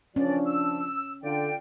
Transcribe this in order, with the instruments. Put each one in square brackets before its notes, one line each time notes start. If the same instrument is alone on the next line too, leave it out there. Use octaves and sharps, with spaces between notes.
[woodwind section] C#2 E3 D5 [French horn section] F3 D4 [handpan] C#4
[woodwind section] E6
[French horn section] D3 [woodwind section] F4 D5 G5